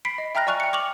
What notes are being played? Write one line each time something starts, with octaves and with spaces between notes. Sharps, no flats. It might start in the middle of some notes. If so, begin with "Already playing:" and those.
B5 B6 C7 D7
D#5
E5 G5 A#5 F6 F#6 A#6
D5 G#5 C#6 F6 F#6 F7
G5 C#7
C#6 D6 F7 F#7